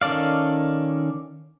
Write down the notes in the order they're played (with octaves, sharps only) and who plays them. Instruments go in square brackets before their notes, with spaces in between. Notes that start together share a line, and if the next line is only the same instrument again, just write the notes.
[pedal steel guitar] D#3 C#4 A4 D5 F5